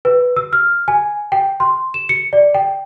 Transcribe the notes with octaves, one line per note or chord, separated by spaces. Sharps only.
B4
E6
F6
G#5
G5
C6
E7
C#7
D5
G5